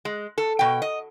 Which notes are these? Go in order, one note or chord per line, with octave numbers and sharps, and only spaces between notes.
G#3
A4
B2 G5
D#5